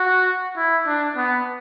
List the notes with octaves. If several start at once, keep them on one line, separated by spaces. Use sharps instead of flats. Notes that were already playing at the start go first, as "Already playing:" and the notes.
Already playing: F#4
E4
D4
B3